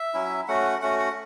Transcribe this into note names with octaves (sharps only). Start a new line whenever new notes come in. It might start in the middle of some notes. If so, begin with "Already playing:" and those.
Already playing: E5
F#3 C#4 E4
A3 C#4 F#4 F#5
A3 C#4 F#4 F#5
F#5